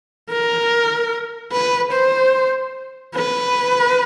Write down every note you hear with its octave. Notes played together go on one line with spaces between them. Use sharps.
A#4
B4
C5
B4